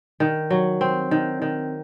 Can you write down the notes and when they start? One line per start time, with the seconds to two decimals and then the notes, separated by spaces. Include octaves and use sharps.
0.20 D#3
0.50 F#3
0.81 C4
1.11 D#3
1.42 D#3